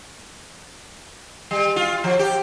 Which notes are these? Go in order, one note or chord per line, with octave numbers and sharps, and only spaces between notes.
G3
F4
F3
G4